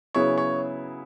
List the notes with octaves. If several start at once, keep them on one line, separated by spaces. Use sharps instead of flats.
C#3 F#3 B3 E4 G#4 C#5
C#5